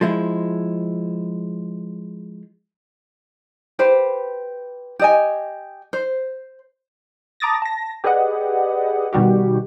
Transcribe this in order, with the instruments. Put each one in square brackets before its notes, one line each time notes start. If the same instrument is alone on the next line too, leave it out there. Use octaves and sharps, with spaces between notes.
[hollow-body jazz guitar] F3 G#3 E4
[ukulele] G4 B4 C5
G4 D#5 G#5
C5
[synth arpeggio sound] A5 A#5 D6 D#6 A6 A#6
A5 A#6
G4 G#4 B4 D5 D#5 F#5
B2 D#3 G3 F#4 G4